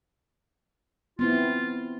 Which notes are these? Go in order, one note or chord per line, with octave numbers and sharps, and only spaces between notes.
B3 C4 E4 F4